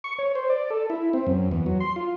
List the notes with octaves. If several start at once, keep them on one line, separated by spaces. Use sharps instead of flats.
C#6
C#5
C5
D5
A4
E4
C4
F#2
E2
F#3
C6
F4